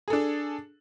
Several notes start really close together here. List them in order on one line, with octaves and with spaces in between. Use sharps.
G#4 A4 D4